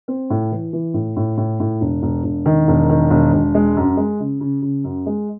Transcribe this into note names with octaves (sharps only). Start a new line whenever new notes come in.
C4
A2
E3
E3
A2
A2
A2
A2
E1
E1
E1
D#3
E1
D#3
E1
E1
G#3
F#2
G#3
C#3
C#3
C#3
F#2
G#3